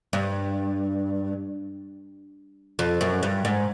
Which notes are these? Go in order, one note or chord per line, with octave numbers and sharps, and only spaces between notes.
G2
F2
F#2
G2
G#2